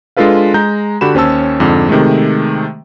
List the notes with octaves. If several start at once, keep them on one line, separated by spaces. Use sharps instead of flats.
G#3 D4 F4 A4 B4 F5
G#3 A#5 G6
D3 F#4 G4 B5 E7
D#2 C#4 C5 C#5 A5 E6
F2 G#2 D3
C3 D#3 G#3 A3